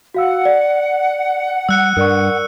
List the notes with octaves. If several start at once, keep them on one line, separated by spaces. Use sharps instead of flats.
F#4 F5 F#5 E6
D5
G3 E6 F#6 C#7
G2 A#4 D5 C#6